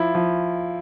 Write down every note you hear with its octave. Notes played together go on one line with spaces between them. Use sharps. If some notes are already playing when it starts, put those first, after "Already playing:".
Already playing: F3 E4
F3